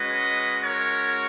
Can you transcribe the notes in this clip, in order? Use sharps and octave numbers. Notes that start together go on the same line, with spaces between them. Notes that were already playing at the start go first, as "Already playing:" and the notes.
Already playing: G#3 C#4 F#4 B4 D#5
A#4 C#5